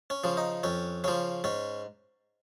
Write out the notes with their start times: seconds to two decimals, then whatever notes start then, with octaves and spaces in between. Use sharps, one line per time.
0.10 C#4
0.24 C#3 F3
0.37 D#4
0.63 F2 C#4
1.04 C#3 F3 C#4
1.44 G#2 C#4